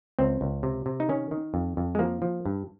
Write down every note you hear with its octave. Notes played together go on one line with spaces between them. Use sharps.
C#2 C4
C#2
C3
C3
D#4
D#3 C#4
D#3
F2
F2
G#3
F3 A#3
F3
G2